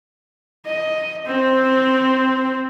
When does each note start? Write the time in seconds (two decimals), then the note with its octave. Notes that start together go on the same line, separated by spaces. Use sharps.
0.66 D#5
1.26 C4